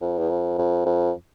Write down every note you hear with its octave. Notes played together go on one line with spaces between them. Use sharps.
F2
E2
F2
F2
F2